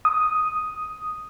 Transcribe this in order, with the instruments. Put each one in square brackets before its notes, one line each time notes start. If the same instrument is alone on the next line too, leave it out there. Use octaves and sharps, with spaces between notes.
[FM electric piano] D#6